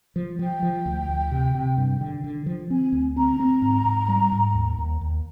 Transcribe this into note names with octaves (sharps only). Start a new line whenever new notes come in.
F3
F3 G5
F3
D2
D2
C3
C3
G2
D3
D3
F3
C4 G#5
D2
C4 A#5
C4
G#2
G#2
G3
G#2
D#2
D#2
D#2